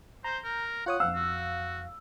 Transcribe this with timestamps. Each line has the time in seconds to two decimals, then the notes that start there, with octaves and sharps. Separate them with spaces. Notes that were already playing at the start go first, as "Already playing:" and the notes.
0.24 C5 A#5 G6
0.44 A#4
0.86 F4 C#5 F#5 D#6
1.00 F2 F5 E6
1.15 F#4